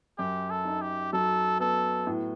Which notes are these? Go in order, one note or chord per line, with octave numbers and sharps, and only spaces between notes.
F#2 G4
A4
D#4
G4
F#3 A4
B3 A4
A2